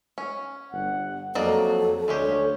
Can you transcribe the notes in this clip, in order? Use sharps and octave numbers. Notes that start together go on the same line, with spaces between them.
C#4
G1 F#5
F2 F#3 A#3 A4 D5 D#5
D2 G#3 C#4 G4 C#5